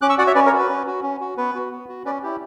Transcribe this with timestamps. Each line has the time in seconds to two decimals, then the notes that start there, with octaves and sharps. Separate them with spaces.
0.02 C#4 D6 F#6
0.09 C#6 E6
0.18 F#4 D5 F#5
0.27 C#5 E5
0.35 C#4 B4 D5
0.46 A#4 C#5
0.53 F#4
0.59 B4
0.69 C#4
0.87 F#4
1.03 C#4
1.21 F#4
1.37 B3 B4
1.55 F#4
1.71 B3
1.89 F#4
2.05 C#4 B4 D5
2.23 E4 G4